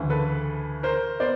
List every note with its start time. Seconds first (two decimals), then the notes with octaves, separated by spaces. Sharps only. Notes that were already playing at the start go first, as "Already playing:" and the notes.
Already playing: D2 C#3 E3
0.10 A4 B4
0.83 A#4 C5
1.20 B3 C5 D5